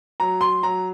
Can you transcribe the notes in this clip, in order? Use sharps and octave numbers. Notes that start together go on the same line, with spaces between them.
F#3 A#5
C6
F#3 A#5